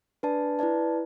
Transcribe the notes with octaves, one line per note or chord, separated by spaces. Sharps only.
D4 B4 D5 A5
E4 B4 D5 A5